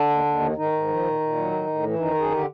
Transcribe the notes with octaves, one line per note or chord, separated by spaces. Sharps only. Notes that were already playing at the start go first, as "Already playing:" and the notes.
Already playing: D3 D4
D#2
D#2
D#3
G#2 D#3 D#4
G#2
F3
A#2
A#2
F#3
A2
A2
E3
E4
F#2 D#3 D#4
F#2 G#4
D3 G4